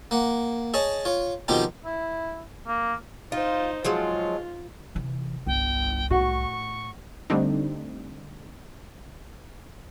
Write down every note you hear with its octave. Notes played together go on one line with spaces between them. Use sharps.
A#3 F#5
G#4 C#5 D#5 A5
F4 C#5
B2 D#3 F3 C4 F4 G4
E4
A#3
D#4 F4 C5
F3 F#3 G#3 F4
C3 E3
G1 C2 G5
A2 F#4 C#6
D3 G3 A3 C4 D4 D#4